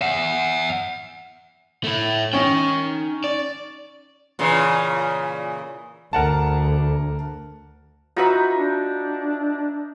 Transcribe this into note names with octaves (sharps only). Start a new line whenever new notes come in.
E5 F#5
A3 E4
C#4 D#4 G5
D5
A#2 C#3 E3
D2 A#4 F#5 A5
D#4 F4 F#4 B4 E5
D4